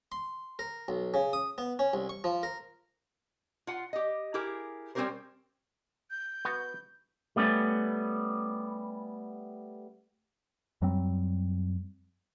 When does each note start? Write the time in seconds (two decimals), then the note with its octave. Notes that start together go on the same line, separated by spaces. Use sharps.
0.12 C6
0.59 A#4
0.88 B1
1.14 C#3
1.33 D#6
1.58 B3
1.79 C#4
1.94 C2
2.09 C#6
2.24 F3
2.43 A#4
3.67 F4 F#5
3.93 G4 D#5
4.34 E4 G4 G#4 A#4
4.95 G3 C4 C#4 G4 A#4 C5
6.11 G6
6.45 B3 F#4
7.36 G3 A3 B3 C#4
10.82 F#2 F#3 G3 C4